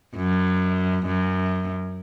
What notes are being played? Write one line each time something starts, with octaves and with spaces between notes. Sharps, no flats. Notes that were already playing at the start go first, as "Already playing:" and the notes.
F#2
F#2